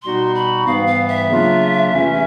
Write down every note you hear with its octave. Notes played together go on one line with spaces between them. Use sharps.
B2 G3 B3 D#4 F#4 C6
B5
G#2 E3 G3 B3 F5
F5
E5
C#3 F#3 A#3 D4 F4
E2 C3 E3 A3 C#4